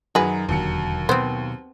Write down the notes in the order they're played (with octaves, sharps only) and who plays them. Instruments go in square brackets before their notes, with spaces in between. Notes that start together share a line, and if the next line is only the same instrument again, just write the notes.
[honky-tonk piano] F#2 D#3 F#3 [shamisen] F#4 G#4 B4
[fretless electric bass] E1 D3 [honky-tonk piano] D#2 F#3 C#7
[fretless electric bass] B2 [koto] B3 C4 [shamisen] C5